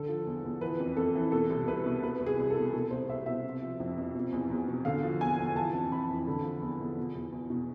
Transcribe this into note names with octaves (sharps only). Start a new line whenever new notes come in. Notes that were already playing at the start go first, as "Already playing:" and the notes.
Already playing: D3 A4
F3
E2
E2
E3 B4
F2
F2 A4
E3
B2 A4
C2
C2 B4
B2
B2 B4
C2
G#4
C2
A4
B2
B2 A4
C2 C5
C2 E5
B2 E5
C3
F3
F2
F2
B2
E2
E2
B2
D3 F5
F3
E2 G#5
E2
E3 A5
F2
F2 B5
E3
D3
F3
E2
E2
B2
E2
E2
B2